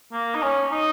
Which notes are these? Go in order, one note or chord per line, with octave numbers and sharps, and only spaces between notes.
A#3
D#4
C#4
D#4